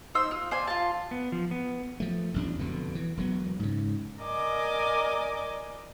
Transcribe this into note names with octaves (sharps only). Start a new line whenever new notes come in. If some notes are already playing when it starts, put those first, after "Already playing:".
D#4 C5 E6
F4
C5 D5 G#5
F4 A5
B3
F3
B3
F3 A3
A1 E2 D4
F1 B2 D3
E3
E1 F#3 B3
G#2 C#3
A#4 D5 D#5 G#5 D6